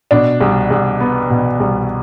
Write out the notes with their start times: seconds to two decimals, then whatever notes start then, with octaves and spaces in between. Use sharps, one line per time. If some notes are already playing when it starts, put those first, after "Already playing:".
0.11 B2 D4
0.41 C2
0.70 C2
1.00 B3
1.30 B2
1.60 C2